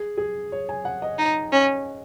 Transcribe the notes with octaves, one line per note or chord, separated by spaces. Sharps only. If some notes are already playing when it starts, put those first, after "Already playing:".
Already playing: G#4
G#4
C#5
G#5
F#5
D#5
D#4
C#4